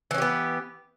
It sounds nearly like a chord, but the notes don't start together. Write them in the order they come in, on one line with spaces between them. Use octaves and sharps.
E3 C#4 G4 B3